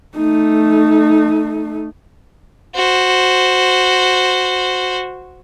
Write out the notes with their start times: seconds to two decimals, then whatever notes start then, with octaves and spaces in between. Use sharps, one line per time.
0.17 A3 D#4
2.75 F#4 C5